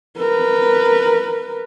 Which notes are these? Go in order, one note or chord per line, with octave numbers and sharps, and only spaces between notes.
A#4 B4